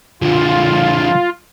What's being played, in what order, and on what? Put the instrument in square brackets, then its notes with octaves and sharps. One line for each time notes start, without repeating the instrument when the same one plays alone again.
[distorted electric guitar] D3 F3 [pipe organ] F4